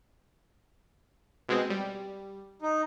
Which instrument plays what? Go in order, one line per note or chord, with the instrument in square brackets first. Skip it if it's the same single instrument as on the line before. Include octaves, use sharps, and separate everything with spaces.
[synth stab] B2 G#3 C4
G3
[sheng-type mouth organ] D#4